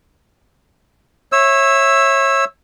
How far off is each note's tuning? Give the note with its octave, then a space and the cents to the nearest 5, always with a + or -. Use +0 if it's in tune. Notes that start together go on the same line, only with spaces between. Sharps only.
C#5 -25 E5 +0 E6 +0